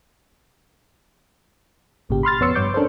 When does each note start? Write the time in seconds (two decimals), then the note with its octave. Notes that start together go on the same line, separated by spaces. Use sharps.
2.09 G#1 A#2 C#3 G4
2.23 B5 C6 F6 A6
2.41 F2 B3 C#5 C6 E6 C#7
2.55 G2 C#5 D6 G6
2.74 C#4 D4 A4 A#4 C5